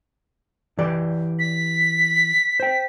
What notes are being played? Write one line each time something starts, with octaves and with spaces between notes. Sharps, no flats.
E3 G4 D5
B6
C5 G5